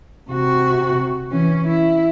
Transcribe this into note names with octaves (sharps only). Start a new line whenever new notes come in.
C3 F#4
E3 C#4
E4